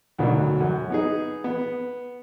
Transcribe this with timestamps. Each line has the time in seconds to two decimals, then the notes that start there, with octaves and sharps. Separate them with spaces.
0.19 D2 G#2 B2 D3 D#3 F#3
0.60 F#2
0.90 B3 D#4 G#4
1.44 B3